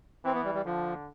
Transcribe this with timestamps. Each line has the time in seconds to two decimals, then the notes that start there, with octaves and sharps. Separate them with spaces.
0.25 E3 C4
0.34 B3
0.44 G3
0.55 G3
0.65 D3 F3